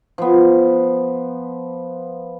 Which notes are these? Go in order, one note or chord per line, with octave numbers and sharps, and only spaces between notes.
F3 B3